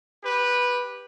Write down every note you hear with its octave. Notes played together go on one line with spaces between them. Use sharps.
G4 B4